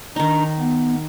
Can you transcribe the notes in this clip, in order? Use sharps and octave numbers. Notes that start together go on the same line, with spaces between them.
D#3 D4 D#4 A#5
B3